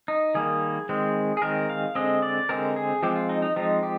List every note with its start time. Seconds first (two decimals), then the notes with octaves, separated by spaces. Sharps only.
0.08 D#4
0.35 D#3 G3 A#3 G#4
0.89 D#3 G#3 C4
1.37 G#4
1.42 D#3 G#3 C4 A#4
1.69 F5
1.95 D3 G#3 C4 D#5
2.22 D5
2.49 D3 G#3 C4 A#4
2.76 G#4
3.03 F3 G#3 C4 G4
3.16 F4
3.29 D#4
3.42 D#4
3.56 F3 G#3 C4 D#4
3.83 G4